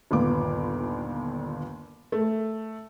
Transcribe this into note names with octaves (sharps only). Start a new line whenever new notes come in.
G1 D#2 A#2 B3 D6
A3